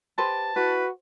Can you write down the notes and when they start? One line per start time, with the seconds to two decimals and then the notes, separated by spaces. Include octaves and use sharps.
0.18 G4 B4 C5 A5
0.56 E4 F#4 B4